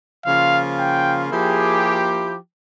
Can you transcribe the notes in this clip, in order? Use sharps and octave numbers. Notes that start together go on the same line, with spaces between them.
C#3 F3 A#3 F4 F5
G5
F3 A#3 E4 G4 G#4